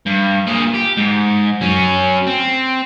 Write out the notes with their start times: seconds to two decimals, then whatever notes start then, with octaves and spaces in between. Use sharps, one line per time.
0.06 G2
0.47 A#2 G#4
0.74 G4
0.97 G#2
1.61 F#3 C#4
2.27 C4